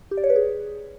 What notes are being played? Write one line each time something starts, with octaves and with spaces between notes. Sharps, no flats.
G4
D5
C#5
B4
G#4